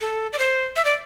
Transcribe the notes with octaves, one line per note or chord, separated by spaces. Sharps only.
A4
D5
C5
E5
D5